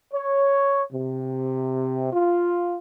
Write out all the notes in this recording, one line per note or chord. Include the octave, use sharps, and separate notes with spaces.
C#5
C3
F4